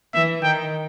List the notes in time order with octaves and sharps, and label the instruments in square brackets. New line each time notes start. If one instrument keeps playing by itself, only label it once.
[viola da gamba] E3 [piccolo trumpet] E5
[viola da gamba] D#3 [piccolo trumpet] G5